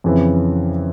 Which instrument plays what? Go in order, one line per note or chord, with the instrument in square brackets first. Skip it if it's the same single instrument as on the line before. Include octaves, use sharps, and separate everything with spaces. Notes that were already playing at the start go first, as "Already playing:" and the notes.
[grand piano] F2 C#3 E3